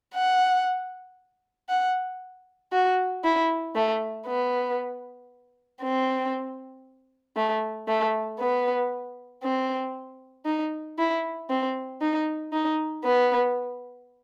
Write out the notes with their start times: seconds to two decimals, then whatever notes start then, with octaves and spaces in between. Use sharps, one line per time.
0.15 F#5
1.69 F#5
2.73 F#4
3.24 E4
3.75 A3
4.27 B3
5.82 C4
7.37 A3
7.88 A3
8.40 B3
9.43 C4
10.46 D#4
10.98 E4
11.50 C4
12.01 D#4
12.53 D#4
13.04 B3